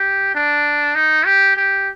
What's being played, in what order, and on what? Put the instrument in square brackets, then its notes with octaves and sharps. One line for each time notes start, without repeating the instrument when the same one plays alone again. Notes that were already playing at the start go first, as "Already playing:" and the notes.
Already playing: [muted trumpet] G4
D4
D#4
G4
G4